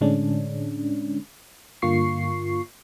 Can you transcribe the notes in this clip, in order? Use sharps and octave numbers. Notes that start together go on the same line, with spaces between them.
A2 D3 G#3 C#4 D4
G2 D3 A#3 F4 C#6 C7